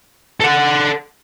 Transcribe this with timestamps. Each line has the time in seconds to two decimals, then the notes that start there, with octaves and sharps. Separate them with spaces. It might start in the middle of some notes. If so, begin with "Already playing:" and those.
0.40 A4 F#5